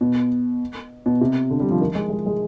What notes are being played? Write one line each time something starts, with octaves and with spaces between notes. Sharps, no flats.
B2
B2
C3
D3
G3
F3
D#3
G#3
G#3
G#3